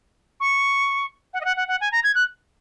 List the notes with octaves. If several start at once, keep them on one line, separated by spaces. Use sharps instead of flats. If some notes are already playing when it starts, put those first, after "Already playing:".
C#6
F#5
D#5
F#5
F#5
F#5
G#5
A#5
G#6
F#6